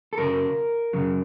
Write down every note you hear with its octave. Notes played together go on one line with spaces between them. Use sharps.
A4
F#2 C#3 F#3 A#4
F#2 C#3 F#3